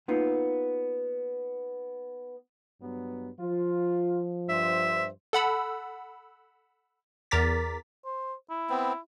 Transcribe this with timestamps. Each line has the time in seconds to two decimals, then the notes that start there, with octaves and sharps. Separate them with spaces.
0.08 A#3 B3 D#4 F4
2.82 G2 F#3 B3
3.40 F3 F4
4.49 G2 C5 E5
5.33 A4 F#5 B5 E6
7.31 E2 A#4 A#5 D6 A6 B6
8.05 C5
8.50 E4
8.70 B3 C4